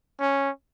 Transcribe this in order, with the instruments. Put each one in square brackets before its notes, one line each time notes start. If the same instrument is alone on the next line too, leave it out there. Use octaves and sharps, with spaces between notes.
[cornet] C#4